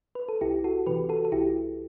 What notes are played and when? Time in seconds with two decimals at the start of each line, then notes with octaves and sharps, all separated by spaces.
0.15 B4
0.29 A4
0.41 C2 E4 G4
0.64 F#4 A4
0.87 C3 E3 G4 B4
1.09 F#4 A4
1.25 A4
1.32 C2 E4 G4